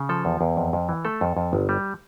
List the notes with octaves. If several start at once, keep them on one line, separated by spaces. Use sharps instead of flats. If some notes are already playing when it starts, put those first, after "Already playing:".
Already playing: C#3
F3 A4
E2
E2
F2
F2
E3
A3 A4
F2
F2
G1
G3